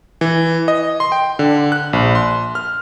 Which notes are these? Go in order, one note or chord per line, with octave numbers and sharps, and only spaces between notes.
E3
D#5
C6
G5
D3
F#6
A#1
C6
F6